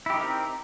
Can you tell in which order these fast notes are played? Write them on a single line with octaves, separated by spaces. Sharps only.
E4 G4 D#4 A#4 C4